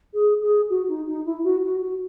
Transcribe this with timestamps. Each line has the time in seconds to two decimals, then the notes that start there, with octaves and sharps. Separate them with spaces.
0.14 G#4
0.42 G#4
0.70 F#4
0.88 D#4
1.07 D#4
1.25 E4
1.44 F#4
1.63 F#4
1.81 F#4